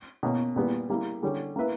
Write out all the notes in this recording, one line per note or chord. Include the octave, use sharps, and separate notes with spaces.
B2 A#3 C#4
A#2 G3 B3
G3 A#3 E4
D3 G3 C#4 G4
A#3 E4 B4 E5